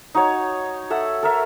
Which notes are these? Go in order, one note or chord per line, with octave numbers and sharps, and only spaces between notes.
D#4 F#4 C#5
A4 E5 F#5
A4 A#4 E5